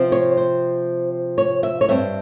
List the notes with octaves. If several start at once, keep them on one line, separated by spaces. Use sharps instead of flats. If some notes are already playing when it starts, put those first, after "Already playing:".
Already playing: C3 F3 C4
C#5
C5
C#5
E5
C#5
G2 G3 C4 E5